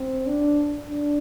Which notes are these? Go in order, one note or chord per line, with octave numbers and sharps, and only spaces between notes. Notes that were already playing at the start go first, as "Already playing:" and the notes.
Already playing: C4
D4
D4